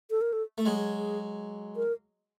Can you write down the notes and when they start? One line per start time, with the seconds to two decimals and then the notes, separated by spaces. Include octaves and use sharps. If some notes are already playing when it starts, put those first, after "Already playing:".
0.11 A4
0.21 A#4
0.33 A4
0.58 A3
0.65 F#3 G#3 G#4
0.93 G#4
1.76 A#4